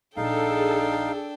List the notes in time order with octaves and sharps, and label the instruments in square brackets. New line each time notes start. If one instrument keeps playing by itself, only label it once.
[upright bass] A#1 [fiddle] D4 G5 [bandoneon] D#4 F5 [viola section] G#4 A4